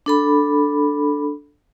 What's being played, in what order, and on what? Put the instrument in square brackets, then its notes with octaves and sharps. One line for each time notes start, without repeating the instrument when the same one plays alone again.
[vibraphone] D4 A4 B5